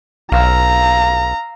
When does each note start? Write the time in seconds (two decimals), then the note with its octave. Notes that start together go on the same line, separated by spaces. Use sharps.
0.32 B1 F5 A#5 E6